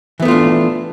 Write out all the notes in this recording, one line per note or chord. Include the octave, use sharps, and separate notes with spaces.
E3 A3 B3 D4 F4